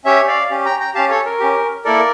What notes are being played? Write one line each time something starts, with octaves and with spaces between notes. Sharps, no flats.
C#4 G4 C#5 E5
D5 F5
C#4 G4
G5 A#5
G5 A#5
C#4 G4 F5 A5
A4 C#5
A#4
C#4 G4
A#3 E4 A4 A#4 D5